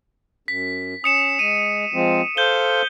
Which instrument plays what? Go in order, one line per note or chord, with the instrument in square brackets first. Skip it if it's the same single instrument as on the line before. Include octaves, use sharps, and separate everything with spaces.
[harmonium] F#2 [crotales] B6
[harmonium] C#4 [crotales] D#6 C#7 E7
[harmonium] G#3 [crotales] D#7
[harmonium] F3 G#3 C4
[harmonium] A4 C5 F5 [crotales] G6 G7